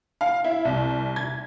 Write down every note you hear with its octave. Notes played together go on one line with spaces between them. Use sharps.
F5
E4
C2
G#6